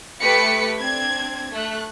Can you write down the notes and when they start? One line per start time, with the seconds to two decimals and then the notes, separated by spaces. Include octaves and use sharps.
0.22 A3 G4 B4 B6 C#7
0.80 C4 D4 G#6
1.52 A3 F#6